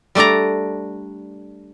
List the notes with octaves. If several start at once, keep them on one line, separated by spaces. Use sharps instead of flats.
G3 A3 D4 D5 A#5